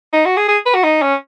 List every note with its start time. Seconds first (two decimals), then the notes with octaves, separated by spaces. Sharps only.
0.13 D#4
0.25 F#4
0.37 G#4
0.48 G#4
0.66 B4
0.74 F#4
0.83 D#4
1.02 C#4